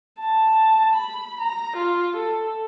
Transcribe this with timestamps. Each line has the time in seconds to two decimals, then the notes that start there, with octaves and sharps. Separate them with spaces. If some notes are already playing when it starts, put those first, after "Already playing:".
0.19 A5
0.95 B5
1.40 A#5
1.76 F4
2.16 A4